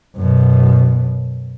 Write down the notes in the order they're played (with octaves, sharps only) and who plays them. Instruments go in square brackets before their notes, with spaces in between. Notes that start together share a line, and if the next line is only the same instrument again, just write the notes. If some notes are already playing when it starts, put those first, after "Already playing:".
[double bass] F#2 B2